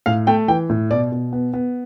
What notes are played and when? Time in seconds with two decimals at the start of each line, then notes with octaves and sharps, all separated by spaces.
0.06 A2 F5
0.27 A3 G5
0.48 E3 G5
0.69 A2
0.91 B2 D5
1.12 B2
1.33 B3
1.54 B3